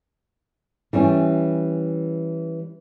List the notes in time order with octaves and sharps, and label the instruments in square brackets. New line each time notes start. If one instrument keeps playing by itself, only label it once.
[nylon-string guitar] E3 G3 C#4